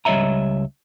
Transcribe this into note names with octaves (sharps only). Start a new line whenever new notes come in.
C#2 G3 C#5 D#5 E5 A#5